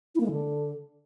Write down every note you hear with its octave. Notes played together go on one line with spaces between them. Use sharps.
E4
A#3
G#3
D3